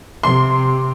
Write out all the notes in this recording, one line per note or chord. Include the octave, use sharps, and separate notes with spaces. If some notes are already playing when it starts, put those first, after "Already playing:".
C3 C6